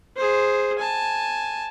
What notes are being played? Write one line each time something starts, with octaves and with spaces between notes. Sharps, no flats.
G#4 C5
G#5 A5